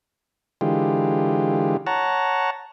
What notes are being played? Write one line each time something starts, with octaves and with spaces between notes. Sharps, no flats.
D3 E3 G#3 F4 G4
C#5 F#5 A5 A#5